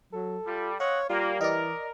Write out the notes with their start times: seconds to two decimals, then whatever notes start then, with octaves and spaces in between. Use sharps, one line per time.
0.13 F#3 A4
0.47 G3 F4
0.80 C4 C#5 D#5 F5 F#5
1.10 G3 A#3 F4
1.41 E3 A#4 D5 D#5